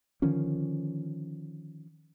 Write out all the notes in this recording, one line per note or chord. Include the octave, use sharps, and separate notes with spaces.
D3 D#3 F3 C#4